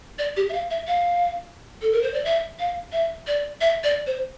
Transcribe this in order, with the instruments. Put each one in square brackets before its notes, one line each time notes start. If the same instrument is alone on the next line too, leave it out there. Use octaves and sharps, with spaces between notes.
[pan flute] D5
G4
E5
F5
E5
F5
A4
A#4
C5
D5
E5
F5
E5
D5
E5
D5
C5